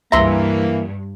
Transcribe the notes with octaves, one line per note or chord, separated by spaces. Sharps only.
C#2 G2 E3 A#3 E5 A#5 C6